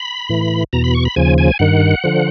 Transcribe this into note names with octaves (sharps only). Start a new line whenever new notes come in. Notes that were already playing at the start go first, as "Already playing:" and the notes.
Already playing: B5
A2 E3
E2 B2 A#5
B5
C#6
B5
D#2 C#3 F3 G#5
G#5
G2 D#3 F#5
D3 F3